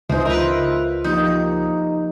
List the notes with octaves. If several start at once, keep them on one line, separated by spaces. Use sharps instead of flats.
C#2 E3 D#4 C5 E5
F4 A#4 B4 E5
F3 A#3 D#4 G4